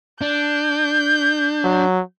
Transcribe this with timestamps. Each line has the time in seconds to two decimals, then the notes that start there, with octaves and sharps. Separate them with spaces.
0.21 D4 G6
1.64 F#3